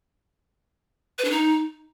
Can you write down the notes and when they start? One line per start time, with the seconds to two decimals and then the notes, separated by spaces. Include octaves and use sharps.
1.19 B4
1.25 D4
1.31 D#4